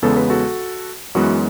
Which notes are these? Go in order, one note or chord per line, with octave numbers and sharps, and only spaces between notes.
E2 C#3 G#3 B3 A4
B4
F#4 A4
F#2 E3 G#3 B3 F#4